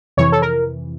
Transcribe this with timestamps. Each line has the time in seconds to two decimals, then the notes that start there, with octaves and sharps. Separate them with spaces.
0.17 F2 C3 E3 C#5
0.32 A4
0.42 A#4